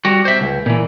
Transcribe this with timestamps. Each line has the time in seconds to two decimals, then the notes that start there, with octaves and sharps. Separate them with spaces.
0.05 G3 F#4
0.25 C5 E5
0.41 C#2
0.66 A#2 E3